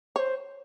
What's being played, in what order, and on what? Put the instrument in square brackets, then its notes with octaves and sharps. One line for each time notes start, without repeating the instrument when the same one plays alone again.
[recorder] C5 [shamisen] C#5